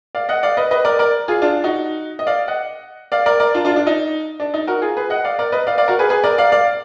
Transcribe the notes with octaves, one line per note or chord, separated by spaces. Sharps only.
D5 F5
D#5 F#5
D5 F5
B4 D#5
B4 D#5
A#4 D5
A#4 D5
F4 G#4
D4 F4
D#4 F#4
D#5
D5 F5
D#5 F#5
D5 F5
A#4 D5
A#4 D5
D4 F4
D4 F4
D4
D#4
D4
D#4
F#4 A#4
F4 G#4
G#4 B4
D#5 F#5
D5 F5
A#4 D5
B4 D#5
D5 F5
D5 F5
F#4 A#4
G#4 B4
G#4 B4
A#4 D5
D5 F5
D5 F5